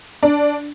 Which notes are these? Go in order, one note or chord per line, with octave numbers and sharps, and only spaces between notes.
D4